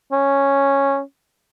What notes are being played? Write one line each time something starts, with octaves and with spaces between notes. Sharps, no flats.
C#4